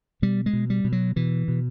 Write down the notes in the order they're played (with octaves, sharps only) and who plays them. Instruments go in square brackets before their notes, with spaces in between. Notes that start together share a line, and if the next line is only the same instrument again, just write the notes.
[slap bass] B2 G3
G#3
B2
G3
B2
F#3
B2 E3
B2